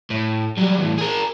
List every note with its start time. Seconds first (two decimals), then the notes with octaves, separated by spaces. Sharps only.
0.10 A2
0.58 F#3 G3
0.79 E2 A2
0.98 G#4 A#4